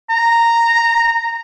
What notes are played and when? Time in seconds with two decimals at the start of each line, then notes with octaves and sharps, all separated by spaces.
0.10 A#5